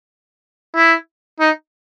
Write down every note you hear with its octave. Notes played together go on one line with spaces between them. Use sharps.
E4
D#4